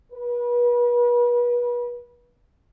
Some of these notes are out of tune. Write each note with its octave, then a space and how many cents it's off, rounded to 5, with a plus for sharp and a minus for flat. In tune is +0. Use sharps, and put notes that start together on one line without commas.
B4 -35